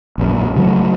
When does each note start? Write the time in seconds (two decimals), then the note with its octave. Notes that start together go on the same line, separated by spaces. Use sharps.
0.18 A#1 F#2
0.56 C#3 F#3 A3